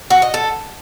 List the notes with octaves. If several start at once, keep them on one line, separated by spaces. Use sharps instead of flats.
F#4
D#5
A4